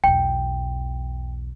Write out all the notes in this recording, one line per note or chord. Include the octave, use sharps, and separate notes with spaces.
B1 E2 G5